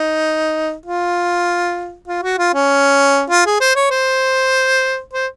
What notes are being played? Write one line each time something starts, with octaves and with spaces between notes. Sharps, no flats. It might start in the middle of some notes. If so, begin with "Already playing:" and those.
Already playing: D#4
F4
F4
F#4
F4
C#4
F4
G#4
C5
C#5
C5
C5